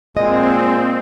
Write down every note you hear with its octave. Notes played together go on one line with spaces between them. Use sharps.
A#2 G#3 C4 D#5